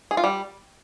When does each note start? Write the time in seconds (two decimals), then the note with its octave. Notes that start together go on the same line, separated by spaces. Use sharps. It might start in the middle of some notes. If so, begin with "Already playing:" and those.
0.11 G#4
0.17 F4
0.24 G3